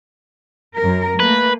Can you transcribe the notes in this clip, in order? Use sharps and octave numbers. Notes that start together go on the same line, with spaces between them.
F#2 A#4
A3 A#3 B4